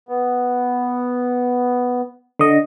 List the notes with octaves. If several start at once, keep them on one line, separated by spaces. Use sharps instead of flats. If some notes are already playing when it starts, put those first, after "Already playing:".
B3
D3 D#5